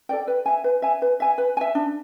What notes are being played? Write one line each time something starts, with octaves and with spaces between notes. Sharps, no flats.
A4 D5 G5
B4
E5 G#5
B4
E5 G#5
B4
E5 G#5
B4
G#5
E5
D4